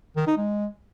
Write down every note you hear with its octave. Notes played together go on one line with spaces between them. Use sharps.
D#3
D#4
G#3